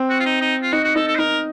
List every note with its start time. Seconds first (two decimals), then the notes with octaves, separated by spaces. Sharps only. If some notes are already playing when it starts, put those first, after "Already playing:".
Already playing: C4
0.10 F#4
0.20 F4
0.25 D#4
0.41 D#4
0.62 F4
0.72 D#4 F#4
0.84 F#4
0.96 D#4 A4
1.07 A4
1.15 C5
1.19 D#4 A#4